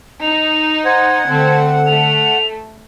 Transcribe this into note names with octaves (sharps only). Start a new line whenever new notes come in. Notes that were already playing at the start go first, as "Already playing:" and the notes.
D#4 F7
C5 F#5 G#6
D3 A3 C4 A4
A3 F7